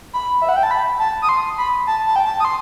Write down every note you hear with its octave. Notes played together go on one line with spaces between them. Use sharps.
B5
E5
F#5
G5
A5
B5
A5
D#6
C6
B5
A5
A5
G5
A5
D#6
C6